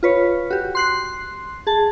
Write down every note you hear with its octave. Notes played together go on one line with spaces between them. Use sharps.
F4 B4 C#5
F#4 G4
C6 F#6 C7
G#4 A5